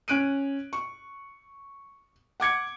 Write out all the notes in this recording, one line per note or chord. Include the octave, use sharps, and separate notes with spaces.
C#4 F#6 D7 D#7
C#6
F#5 D6 G#6 C#7